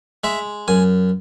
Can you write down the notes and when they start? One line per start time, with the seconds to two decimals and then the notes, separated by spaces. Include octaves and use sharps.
0.24 G#3 E5
0.68 F#2 G#5